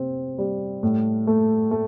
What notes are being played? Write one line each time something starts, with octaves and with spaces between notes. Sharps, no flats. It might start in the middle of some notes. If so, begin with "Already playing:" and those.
Already playing: C3 C4
G3
A2
A3
A3